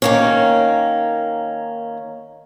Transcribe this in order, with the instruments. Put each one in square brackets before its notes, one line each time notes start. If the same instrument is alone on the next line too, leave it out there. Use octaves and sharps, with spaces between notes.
[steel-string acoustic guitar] D#3 A#3 C#4